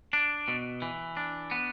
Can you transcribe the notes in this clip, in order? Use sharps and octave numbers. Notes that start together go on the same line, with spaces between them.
D4
B2
E3
D4
B3